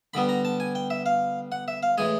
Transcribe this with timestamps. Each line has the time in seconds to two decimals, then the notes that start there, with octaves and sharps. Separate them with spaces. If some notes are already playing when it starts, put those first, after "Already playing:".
0.14 D3 G3 B3 B5
0.29 A#5
0.45 A5
0.60 G#5
0.75 G5
0.90 E5
1.06 F5
1.52 F#5
1.68 E5
1.83 F5
1.98 A2 E3 G#3 G#5